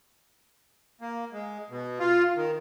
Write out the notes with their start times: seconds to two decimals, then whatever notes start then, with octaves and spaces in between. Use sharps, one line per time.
1.01 A#3
1.33 G#3
1.70 B2
2.00 F4
2.36 D#3